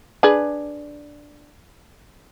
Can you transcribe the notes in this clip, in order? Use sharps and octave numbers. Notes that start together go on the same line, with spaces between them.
D4 G#4 B4